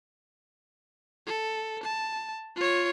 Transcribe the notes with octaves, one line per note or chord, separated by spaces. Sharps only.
A4
A5
F4 C#5